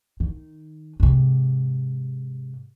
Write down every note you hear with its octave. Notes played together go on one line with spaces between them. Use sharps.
D#3
G#2 C3